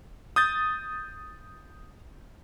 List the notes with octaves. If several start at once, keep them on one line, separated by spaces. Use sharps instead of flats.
D#6 G6 A6